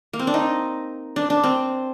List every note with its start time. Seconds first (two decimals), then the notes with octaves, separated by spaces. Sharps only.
0.13 A#3
0.19 C4
0.27 D4
0.34 D#4
1.16 D4
1.30 D4
1.44 C4